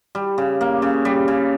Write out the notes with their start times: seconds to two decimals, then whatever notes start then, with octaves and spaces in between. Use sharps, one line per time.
0.15 G3
0.38 C#3
0.61 A#3
0.82 C#3
1.05 G3
1.28 C#3